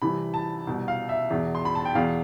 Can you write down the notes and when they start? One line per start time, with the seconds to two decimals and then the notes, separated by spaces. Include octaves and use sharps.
0.02 C2 C3 E3 B5
0.34 A5
0.67 C2 B2
0.88 F5
1.09 E5
1.30 E2 B2
1.55 C6
1.65 B5
1.75 A5
1.85 G5
1.95 E2 B2 F5